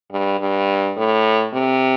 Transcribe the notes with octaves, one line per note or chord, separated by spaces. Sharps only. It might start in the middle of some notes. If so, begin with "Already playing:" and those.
G2
G2
A2
C3